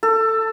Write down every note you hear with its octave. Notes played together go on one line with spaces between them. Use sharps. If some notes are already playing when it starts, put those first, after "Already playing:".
A4